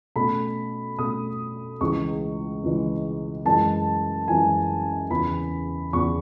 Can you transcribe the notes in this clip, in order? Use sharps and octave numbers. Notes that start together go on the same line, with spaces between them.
B2 A3 C#4 B5
B2 A3 C#4 D#6
C#2 C#3 E3 G#3 C#6
C#2 C#3 E3 G#3
F#2 E3 G#3 A5
F#2 E3 G#3 G#5
E2 C#3 E3 B3 B5
E2 C#3 E3 B3 C#6